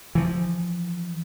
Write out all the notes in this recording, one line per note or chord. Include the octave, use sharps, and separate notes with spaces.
E3 F3